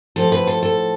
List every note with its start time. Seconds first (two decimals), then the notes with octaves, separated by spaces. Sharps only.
0.16 A2 F3 A4
0.32 B4
0.47 A4
0.63 A4